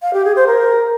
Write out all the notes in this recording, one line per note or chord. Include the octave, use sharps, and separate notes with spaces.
F5
G4
G#4
C5
A#4